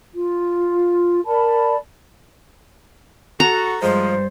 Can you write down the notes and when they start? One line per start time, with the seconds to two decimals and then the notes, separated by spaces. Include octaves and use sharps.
0.14 F4
1.26 A#4 D5 A5 B5
3.40 F#4 A4 A#5
3.82 G2 F3 G#3 C5